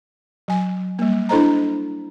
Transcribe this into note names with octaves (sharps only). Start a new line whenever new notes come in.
F#3 G#5
G3 A#3
D4 E4 A4 C5 D#5 A#5